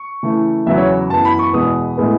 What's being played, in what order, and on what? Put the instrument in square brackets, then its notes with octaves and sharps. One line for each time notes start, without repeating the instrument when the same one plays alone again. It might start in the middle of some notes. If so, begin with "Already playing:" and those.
Already playing: [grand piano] C#6
C#3 E3 A3
E2 C#3 F#3 B3 E5
C#5
F#2 E3 B3 A5
B5
C#6
E2 B2 G#3 B3 D#6
A2 G#3 B3